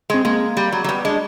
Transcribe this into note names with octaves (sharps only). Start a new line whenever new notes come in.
G#3 C4
G#3 A#3
G3
F#3
F#3
G3 B3
G#3 D4